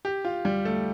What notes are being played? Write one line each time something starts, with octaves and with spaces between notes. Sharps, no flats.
G4
F4
G3
A3